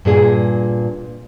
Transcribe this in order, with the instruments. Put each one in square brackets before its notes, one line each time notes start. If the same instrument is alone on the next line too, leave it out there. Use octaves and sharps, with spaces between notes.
[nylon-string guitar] G2 A#2 G#4